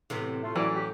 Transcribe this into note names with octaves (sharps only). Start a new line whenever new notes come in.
A2 C3 E3 B3
A3 F4
E3 F#3 C#4 E4 D5
G4